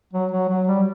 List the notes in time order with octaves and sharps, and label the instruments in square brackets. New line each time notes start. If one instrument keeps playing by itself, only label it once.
[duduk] F#3
F#3
F#3
G3